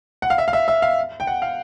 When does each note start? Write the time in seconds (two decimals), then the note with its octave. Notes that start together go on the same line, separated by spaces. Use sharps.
0.22 F#5
0.30 F5
0.38 E5
0.48 F5
0.53 E5
0.68 E5
0.82 F5
1.20 G5
1.27 F#5
1.42 F5